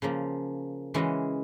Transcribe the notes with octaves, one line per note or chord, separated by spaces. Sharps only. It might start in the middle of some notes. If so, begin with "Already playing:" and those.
C#3 F3 A#3
C#3 E3 G#3 C#4 F#4